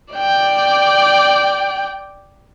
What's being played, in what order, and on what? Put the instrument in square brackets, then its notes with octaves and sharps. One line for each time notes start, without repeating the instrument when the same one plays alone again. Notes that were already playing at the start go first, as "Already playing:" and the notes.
[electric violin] D5 G5